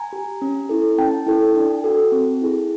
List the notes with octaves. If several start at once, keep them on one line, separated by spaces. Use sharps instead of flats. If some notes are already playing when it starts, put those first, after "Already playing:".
Already playing: G#5 A#5
G4
C#4
E4 A4
C#4 G5 A5
E4 A4
D4
F#4 A4
C4
E4 G#4